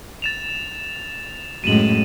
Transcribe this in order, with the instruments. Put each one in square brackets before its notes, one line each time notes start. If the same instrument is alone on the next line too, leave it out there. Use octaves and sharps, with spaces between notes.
[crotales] A6 E7 F7
[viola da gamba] F#2 A2 G#3 [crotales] D#7 E7 F#7